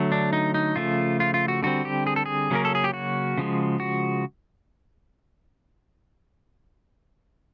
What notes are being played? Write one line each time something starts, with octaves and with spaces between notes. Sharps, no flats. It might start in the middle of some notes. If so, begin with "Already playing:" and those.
Already playing: D3 F#3 A3
D4
D#4
D#4
C#3 F3 A3 F4
F4
F4
F#4
D3 G3 C4 F#4
G4
G#4
A4
G#4
C#3 F#3 A#3 C#4 A#4
A4
G#4
G4
F#4
C#3 F3 G#3
F#4